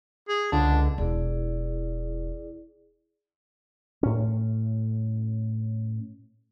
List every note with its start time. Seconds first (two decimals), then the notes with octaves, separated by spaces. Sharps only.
0.29 G#4
0.52 C#2 D3 D4
0.98 E1 E4 G#4 D5
4.03 A2 C#4